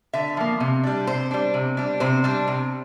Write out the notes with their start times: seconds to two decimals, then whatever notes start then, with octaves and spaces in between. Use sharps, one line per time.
0.13 D3 E5
0.37 F3 A#3
0.60 C3
0.84 G3 D4
1.07 C3 C5
1.31 G3 D4
1.54 C3
1.77 G3 D4
2.00 C3 C5
2.24 G3 D4
2.48 C3